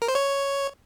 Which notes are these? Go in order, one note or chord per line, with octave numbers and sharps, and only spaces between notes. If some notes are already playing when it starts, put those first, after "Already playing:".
A#4
C5
C#5